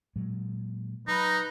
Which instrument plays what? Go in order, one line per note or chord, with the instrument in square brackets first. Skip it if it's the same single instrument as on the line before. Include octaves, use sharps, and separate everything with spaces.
[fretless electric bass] A#2 F#3 G#3
[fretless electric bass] F#3 [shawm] D#4 [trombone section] B4 [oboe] A#5